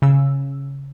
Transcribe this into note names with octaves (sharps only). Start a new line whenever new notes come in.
C#3 E6